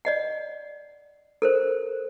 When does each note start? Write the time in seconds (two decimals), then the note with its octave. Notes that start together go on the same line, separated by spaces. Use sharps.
0.05 D5 D#5 F#5
1.42 A4 A#4 C5